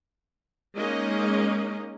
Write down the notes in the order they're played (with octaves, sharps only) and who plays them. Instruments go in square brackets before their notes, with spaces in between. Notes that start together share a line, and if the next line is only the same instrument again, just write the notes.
[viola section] G#3 A#3 C#4 D#4 D#5